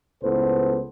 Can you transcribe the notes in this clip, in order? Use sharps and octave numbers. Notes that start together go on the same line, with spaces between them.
C#2 A2 B3 A4 B4 C5